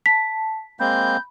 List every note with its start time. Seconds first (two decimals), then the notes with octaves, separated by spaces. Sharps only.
0.06 A5 B6
0.80 G#3 A#3 C4 B5 G6